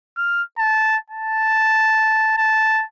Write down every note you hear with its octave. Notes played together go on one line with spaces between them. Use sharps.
F6
A5
A5
A5